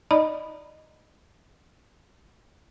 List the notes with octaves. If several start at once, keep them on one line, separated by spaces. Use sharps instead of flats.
D#4 D5 D#5 A#5 B5